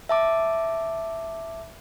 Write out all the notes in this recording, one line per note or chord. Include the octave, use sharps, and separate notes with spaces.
E5 A5 D6